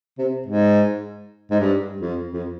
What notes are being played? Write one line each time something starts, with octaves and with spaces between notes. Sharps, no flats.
C3
G#2
G#2
G2
F2
F2